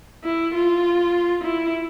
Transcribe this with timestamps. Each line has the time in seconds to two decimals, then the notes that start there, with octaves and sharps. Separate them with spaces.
0.24 E4
0.54 F4
1.44 E4